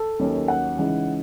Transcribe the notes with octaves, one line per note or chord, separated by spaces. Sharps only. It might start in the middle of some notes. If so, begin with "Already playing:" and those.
Already playing: A4
D#2 D#3 F#3 C#4
F#5
C#3 E3 G#3 D#4